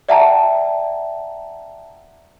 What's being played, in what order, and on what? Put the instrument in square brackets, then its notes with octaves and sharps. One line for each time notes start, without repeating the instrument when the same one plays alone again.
[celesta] D5 E5 F#5 G5 A5 A#5